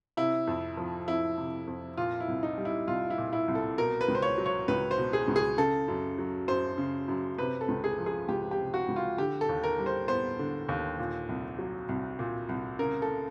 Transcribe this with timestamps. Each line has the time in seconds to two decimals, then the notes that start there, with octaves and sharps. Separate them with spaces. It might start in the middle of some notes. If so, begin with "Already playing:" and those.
0.17 C3 E4
0.47 F2
0.77 F3
1.07 F2 E4
1.38 C3
1.68 F2
1.97 A#2 F4
2.20 E4
2.28 C2
2.43 D#4
2.58 G3
2.65 E4
2.87 C2 F4
3.10 E4
3.18 A#2
3.33 E4
3.48 C2
3.55 A4
3.78 B2 A#4
4.01 B4
4.08 C#2
4.15 C5
4.22 C#5
4.38 F#3
4.46 C#5
4.68 C#2 B4
4.91 C5
4.98 B2
5.13 G#4
5.28 C#2
5.36 G#4
5.58 C#3 A4
5.88 F#2
6.18 F#3
6.48 F#2 C5
6.78 C#3
7.08 F#2
7.38 C3 B4
7.61 A4
7.68 C#2
7.84 G#4
7.98 F3
8.06 G#4
8.28 C#2 G4
8.51 G4
8.58 C3
8.74 F#4
8.88 C#2
8.96 F4
9.18 D3 G4
9.41 A4
9.49 D#2
9.63 A#4
9.79 G3
9.86 C5
10.08 B3 C5
10.39 D3
10.69 D#2
10.99 A#2
11.29 C2
11.59 F#3
11.89 C2
12.19 A#2
12.49 C2
12.79 C#3 A#4
13.02 A4